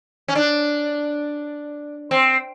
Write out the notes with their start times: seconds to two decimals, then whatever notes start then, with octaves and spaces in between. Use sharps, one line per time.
0.28 C#4
0.36 D4
2.11 C4